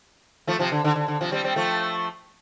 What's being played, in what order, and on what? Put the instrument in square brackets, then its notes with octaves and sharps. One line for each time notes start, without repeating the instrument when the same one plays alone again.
[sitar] F3 A3
C3 F3
D3
D3
D3
D3
C3 F3
G3 C4
G3 C4
F3 A3